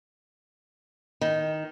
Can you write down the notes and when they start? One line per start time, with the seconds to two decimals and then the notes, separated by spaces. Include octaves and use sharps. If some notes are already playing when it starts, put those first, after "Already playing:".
1.21 D#3